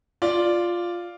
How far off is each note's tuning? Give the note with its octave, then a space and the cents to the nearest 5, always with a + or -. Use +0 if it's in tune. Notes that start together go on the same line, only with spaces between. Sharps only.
F4 +0 D5 +0